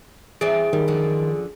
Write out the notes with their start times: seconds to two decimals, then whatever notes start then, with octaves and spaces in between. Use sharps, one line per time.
0.41 E3 C4 G#4 D5
0.73 D#3 G3
0.88 F#2 D3 F3